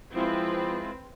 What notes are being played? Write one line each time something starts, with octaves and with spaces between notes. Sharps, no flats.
F3 G#3 C4 E4 F4 B4